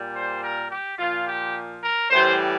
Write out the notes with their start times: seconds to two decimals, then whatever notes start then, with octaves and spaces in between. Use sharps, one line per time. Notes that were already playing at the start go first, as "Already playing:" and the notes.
Already playing: A#2 G3
0.15 C5
0.42 A#4
0.71 G4
0.99 A#2 F3 F4
1.27 G4
1.83 A#4
2.10 A2 E3 G3 C5